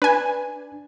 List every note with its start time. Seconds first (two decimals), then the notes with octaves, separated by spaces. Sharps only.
0.02 D4 B4 G#5